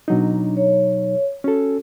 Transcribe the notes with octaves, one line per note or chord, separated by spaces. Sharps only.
B2 F#3 D4 D#4
C#5
C#4 F#4 A4